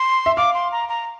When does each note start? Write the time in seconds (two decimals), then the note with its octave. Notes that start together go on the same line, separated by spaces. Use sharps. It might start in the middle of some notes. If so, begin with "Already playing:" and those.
Already playing: C6
0.26 E5
0.37 F5 D6
0.54 C6
0.72 A#5
0.89 A#5